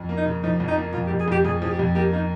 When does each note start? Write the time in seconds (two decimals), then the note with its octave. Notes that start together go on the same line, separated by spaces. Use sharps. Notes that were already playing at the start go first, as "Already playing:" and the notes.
Already playing: F2
0.09 A#3
0.17 D#4
0.26 C#3
0.43 F3 D#4
0.60 F2
0.68 D#4
0.77 A#3
0.94 F2 F4
1.07 G4
1.11 F2
1.20 G#4
1.28 F2 G4
1.45 F2 G#4
1.62 F3 G#4
1.70 G4
1.79 F2
1.95 A#3 G4
2.13 A#3 D#4